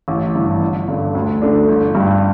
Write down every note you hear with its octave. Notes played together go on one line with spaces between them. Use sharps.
A1
G2 E3
G1
G2 D3
D2
D3 A3 D4
G1
G2 G3